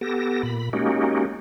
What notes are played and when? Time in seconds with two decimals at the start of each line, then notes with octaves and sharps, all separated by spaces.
0.01 B3 G4 A4 A#6
0.43 A#2 B5
0.73 G#3 A#3 C#4 D#4 F#4 G4